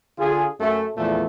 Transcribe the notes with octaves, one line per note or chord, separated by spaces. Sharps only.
D3 F4 G#4
F#2 A3
E2 A#2 F3 A3